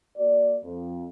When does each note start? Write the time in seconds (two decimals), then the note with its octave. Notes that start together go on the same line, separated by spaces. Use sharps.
0.17 A#3 F#4 D5
0.64 F2